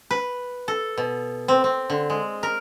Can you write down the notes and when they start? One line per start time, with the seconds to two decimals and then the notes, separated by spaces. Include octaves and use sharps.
0.11 B4
0.68 A4
0.98 B2
1.48 C4
1.64 C4
1.90 D3
2.10 G#3
2.43 A#4